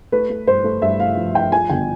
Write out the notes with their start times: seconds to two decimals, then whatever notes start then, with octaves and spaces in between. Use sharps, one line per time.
0.12 A3 B4
0.30 A3
0.47 G2 C5
0.64 A3
0.82 G2 E5
1.00 A3 F5
1.17 F3
1.35 F3 G5
1.52 F3 G#5
1.69 G1 G5